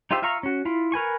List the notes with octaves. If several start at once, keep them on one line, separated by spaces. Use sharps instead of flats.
D#4 F4 G4 C5 E5
F4 E5 F5 A#5 C#6
C#4 F#4
E4 F4
A#4 B4 G#5 C#6